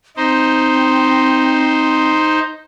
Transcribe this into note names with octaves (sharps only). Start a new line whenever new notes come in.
C4 D#4 C5